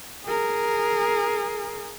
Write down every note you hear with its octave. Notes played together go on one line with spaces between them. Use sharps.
G#4 A#4